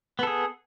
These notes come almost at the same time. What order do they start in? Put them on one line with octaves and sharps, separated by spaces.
B3 A4 G#4